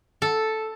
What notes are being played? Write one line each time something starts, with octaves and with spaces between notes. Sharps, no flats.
A4